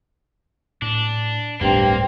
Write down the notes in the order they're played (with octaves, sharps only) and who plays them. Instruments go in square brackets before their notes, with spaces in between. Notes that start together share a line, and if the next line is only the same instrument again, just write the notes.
[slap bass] A2 [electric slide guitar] D4
[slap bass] D1 G1 A3 [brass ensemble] G2 [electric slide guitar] A#3 [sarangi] C4